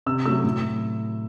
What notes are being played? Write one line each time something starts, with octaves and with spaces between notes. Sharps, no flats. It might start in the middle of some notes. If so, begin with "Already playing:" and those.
C3 E6
F#3 A3 E6
A2